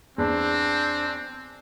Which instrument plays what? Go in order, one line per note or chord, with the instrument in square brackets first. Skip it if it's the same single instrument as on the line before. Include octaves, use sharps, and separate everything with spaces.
[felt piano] E2 [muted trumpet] C4 [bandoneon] D4